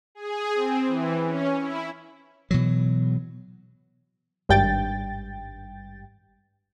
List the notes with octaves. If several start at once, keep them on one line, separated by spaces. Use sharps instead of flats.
G#4
C4
E3
C#4
E4
B2 E3 F#3
G#1 G2 G5 A6